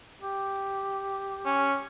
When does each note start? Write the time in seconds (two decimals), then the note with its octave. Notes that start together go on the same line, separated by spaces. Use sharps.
0.22 G4
1.45 C#4